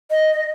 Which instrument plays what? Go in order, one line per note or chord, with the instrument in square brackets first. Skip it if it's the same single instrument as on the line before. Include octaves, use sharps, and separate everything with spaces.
[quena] D#5